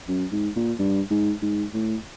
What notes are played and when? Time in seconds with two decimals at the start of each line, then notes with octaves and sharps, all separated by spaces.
0.08 F#2
0.32 G#2
0.56 A#2
0.79 G2
1.10 G#2
1.42 G#2
1.74 A2